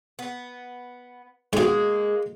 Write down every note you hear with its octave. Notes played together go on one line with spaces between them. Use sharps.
B3
G#2 B2 G#3 A#3